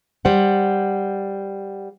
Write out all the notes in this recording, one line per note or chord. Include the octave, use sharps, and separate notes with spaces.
G3 C5 F#5